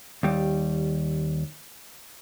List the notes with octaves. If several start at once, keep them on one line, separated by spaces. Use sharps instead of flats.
D#2 G3